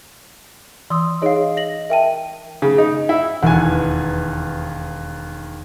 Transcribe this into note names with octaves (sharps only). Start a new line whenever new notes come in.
E3 C6 D#6 E6
D#4 G#4 C#5 D#5 F5
D#5 A#6 F#7
A#4 E5 G5 A5 D#7
C#3
D#4
E4
E1 D#2 E3 F#5 G#5